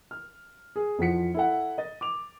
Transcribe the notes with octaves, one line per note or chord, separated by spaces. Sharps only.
F6
G#4
F2 E3 F3 F#5 B6 C#7
E4 A4 F#5
D#5 A6
D6 F7